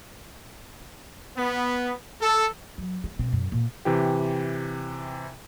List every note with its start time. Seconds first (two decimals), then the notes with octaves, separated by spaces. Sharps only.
1.37 B3
2.22 A4
2.78 F#3
3.04 G#3
3.19 B2 C4
3.33 F#2
3.52 A#2
3.85 C3 E3 G4